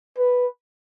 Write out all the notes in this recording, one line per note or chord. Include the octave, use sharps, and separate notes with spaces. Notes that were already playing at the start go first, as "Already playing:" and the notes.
B4